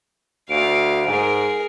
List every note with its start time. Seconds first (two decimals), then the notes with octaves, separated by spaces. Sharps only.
0.50 D2 F5 D7
1.07 G#2 G#4 A#4